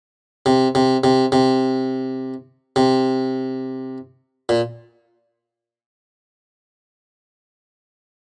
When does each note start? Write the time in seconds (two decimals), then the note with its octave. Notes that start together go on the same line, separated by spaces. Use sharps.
0.46 C3
0.75 C3
1.04 C3
1.32 C3
2.76 C3
4.49 A#2